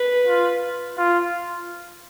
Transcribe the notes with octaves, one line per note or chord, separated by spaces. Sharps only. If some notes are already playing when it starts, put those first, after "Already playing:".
Already playing: B4
F4
F4